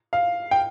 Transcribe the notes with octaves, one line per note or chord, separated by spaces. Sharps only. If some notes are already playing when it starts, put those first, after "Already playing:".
F5
G5